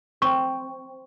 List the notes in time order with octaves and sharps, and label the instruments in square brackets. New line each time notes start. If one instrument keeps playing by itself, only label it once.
[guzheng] C4 [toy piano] C#6